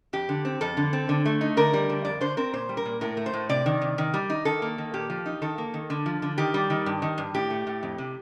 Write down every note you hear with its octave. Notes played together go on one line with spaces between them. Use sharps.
F2 G4
D3
C4
F2 A4
D3
C4
D3
A3
D#4
D3 A#4
G3
D3
F2 D5
D3 C5
C4 A#4
A#2 C5
G3
A#4
A#2
A2 A#4
A3
C5
A2
C3 D5
D#3
C3
D#3
G3
D#4
D#3 A4
A#3
D#3
A#2 G4
F3
D#4
D#3 A4
A#3
D#3
D3
F3
D3
D#3 G4
G3
D#3
G2
D#3
G2
A2 G4
A3
A2
F2
C3